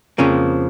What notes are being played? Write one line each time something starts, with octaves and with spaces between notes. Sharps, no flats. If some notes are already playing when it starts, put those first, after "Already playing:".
F2 C#3 F3 A#3 C#4